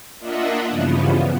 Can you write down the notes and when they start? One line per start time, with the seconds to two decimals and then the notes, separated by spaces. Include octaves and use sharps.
0.19 A#3 D4 F4 D#5 E5 F#5
0.66 G2 C#3 E3 F3 B3